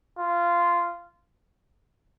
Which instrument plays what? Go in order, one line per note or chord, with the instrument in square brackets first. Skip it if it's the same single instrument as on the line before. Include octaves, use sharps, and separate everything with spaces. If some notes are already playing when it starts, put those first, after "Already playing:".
[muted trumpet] F4